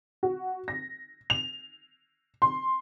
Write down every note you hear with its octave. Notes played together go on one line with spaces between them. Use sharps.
F#4
A#6
F7
C6